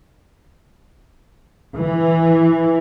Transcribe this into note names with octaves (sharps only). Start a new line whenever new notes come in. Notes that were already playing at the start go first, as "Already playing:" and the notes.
E3